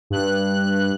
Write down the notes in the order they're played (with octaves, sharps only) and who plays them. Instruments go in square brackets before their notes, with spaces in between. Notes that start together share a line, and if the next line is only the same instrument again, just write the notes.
[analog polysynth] G2 F#6